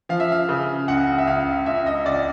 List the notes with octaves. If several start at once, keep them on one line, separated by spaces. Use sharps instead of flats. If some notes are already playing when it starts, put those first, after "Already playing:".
F3 F5
E5
F5
C#3
C#2 F#5
E5
C#2 F5
C#2 E5
D#5
C#2 D5